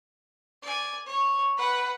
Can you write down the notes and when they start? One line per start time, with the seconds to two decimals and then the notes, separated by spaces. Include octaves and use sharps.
0.62 D5 G#5
1.06 C#5
1.58 B4 F#5